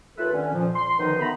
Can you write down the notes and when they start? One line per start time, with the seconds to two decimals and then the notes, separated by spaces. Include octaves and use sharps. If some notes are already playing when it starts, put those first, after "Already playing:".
0.18 D#2 A3 F4 A4 B4
0.33 D3 D#3 C#4
0.53 F2 A#2 F3
0.75 C6
0.99 F#2 B2 D3 D#3 F3 D#4
1.20 A3 B3 A#5 B5